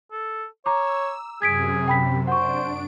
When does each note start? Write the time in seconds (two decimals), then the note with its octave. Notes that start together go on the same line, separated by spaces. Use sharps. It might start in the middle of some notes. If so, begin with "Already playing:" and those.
0.12 A4
0.66 C#5 A#5 D6 E6
1.42 F#2 C3 G#4 G#6 B6 D7
1.88 G5 B5 B6
2.27 D4 C5 F#5 C#6 D7